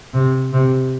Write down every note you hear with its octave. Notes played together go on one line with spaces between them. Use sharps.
C3
C3